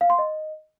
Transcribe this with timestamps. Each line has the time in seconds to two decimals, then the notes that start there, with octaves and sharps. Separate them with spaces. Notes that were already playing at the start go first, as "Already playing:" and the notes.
0.01 F5
0.10 C6
0.19 D#5